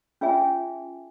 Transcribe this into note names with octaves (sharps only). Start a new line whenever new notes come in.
C#4 F4 G#4 E5 G#5